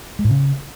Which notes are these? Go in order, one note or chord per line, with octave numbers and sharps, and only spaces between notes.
G#3
A2
C#3